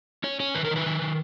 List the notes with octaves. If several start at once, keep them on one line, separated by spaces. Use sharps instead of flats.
C#4 C#5
C#4 C#5
D#3 B4
A#4
D#3 B4
D#3
D#3